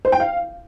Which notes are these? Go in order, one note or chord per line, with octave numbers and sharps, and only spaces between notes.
C5
G5
F5